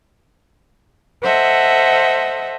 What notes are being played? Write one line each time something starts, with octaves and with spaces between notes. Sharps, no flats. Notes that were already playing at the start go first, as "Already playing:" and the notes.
A4 C5 D#5 E5 F#5